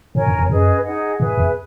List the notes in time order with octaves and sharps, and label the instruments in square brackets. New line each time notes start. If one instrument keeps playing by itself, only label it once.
[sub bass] G#2 [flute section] A#4 C#5 G#5
[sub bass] F#2
E2
[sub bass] F#2 [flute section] C#4 G#4 B4 D#5
[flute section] D#4 G#4 D#5 F#5
[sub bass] G#2 [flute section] G#4 B4 E5 G#5
[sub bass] E2